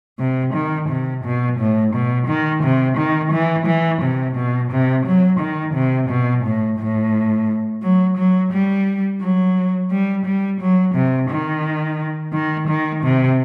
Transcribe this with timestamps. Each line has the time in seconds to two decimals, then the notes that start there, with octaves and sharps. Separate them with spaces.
0.19 C3
0.54 D#3
0.89 C3
1.24 B2
1.59 A2
1.94 B2
2.27 D#3
2.63 C3
2.97 D#3
3.32 E3
3.67 E3
4.02 C3
4.36 B2
4.71 C3
5.06 F#3
5.40 D#3
5.74 C3
6.10 B2
6.45 A2
6.79 A2
7.83 F#3
8.18 F#3
8.52 G3
9.21 F#3
9.91 G3
10.26 G3
10.61 F#3
10.95 C3
11.30 D#3
12.33 D#3
12.68 D#3
13.04 C3